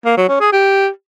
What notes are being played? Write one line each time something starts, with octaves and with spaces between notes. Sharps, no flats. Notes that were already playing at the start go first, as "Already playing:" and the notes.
A#3
F#3
C#4
G#4
G4